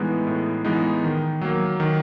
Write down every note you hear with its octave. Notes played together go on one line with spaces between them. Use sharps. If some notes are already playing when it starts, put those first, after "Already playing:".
Already playing: A2 E3 G#3 B3 D#4
A2
E3 G#3 B3 D#4
D#3
F#3 A#3
D#3